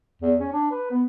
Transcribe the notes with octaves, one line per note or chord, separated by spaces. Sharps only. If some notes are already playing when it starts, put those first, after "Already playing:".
E2
C#4
D4
B4
B3